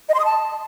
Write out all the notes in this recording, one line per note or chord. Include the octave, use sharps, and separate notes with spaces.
D#5
C6
D#6
A5